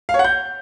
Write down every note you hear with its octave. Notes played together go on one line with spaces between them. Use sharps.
F5
C#5
F#5
G6